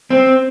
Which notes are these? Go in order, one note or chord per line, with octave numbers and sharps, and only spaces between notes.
C4